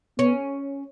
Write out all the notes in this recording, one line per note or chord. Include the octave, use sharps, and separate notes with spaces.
B3 C#4